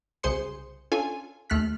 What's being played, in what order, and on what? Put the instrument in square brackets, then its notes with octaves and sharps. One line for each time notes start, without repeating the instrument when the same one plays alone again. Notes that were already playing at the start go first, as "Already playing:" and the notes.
[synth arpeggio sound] C2 C#3 G#4 C5 C6 C#7
C#4 D4 F4 A4 G#5
D#2 A3 F6 F#6 B6